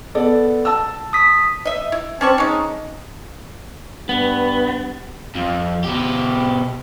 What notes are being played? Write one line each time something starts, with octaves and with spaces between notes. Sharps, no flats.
B3 A4 D5
A5 E6
D#6 B6
D#5 E5
E4
C4 C#4 D5 A5 C#6
G#3 C#4 D#4
G2 B3
F2
B2 G4